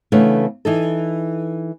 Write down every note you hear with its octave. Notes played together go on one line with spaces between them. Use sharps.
C#3 E3 A3 B3 D4
E3 D#4 A4